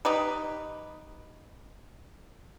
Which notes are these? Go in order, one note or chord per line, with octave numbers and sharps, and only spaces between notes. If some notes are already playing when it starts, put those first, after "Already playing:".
D#4 G4 B4